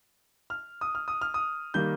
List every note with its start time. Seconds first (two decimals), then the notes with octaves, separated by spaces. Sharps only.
0.50 F6
0.81 D#6
0.95 F6
1.08 D#6
1.21 F6
1.34 D#6
1.74 D#3 G3 A#3 G6